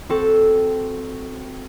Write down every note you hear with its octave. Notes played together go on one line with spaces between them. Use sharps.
C4 F#4 A4